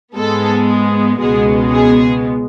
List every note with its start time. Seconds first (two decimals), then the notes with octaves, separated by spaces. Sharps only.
0.15 G#2 G#3 B3 A4
1.20 C#2 B2 G#3 B3 G#4
1.72 G#4